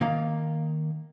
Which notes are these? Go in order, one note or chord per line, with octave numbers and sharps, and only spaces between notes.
D#3 A#3 F5